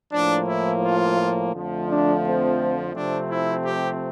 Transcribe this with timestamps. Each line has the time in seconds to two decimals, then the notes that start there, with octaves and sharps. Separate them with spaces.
0.12 A2 F3 A#3 D4
0.47 E4
0.82 F4
1.53 F2 D3 F3 A3
1.88 D4
2.24 C4
2.94 C3 F3 A3 C4 D4
3.29 E4
3.64 G4